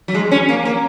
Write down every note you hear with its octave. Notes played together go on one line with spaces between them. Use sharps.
F#3
G#3
C#4
A#3
A#3